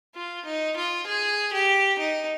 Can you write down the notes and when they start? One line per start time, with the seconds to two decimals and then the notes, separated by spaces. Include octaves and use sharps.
0.15 F4
0.45 D#4
0.77 F4
1.07 G#4
1.53 G4
1.99 D#4